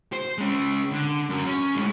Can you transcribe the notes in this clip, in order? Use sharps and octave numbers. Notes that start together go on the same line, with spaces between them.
C5
G#3 C#4
D3
F#2
C#4
A2 G#3